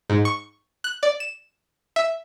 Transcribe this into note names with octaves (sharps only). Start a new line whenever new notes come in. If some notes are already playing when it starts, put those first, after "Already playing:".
G#2
C#6
F#6
D5
E7
E5